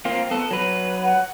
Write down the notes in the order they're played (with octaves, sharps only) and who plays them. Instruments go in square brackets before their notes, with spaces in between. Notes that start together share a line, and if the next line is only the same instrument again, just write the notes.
[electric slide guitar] A#3 C4 F4
B3 A4
F#3 B4
[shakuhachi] F#5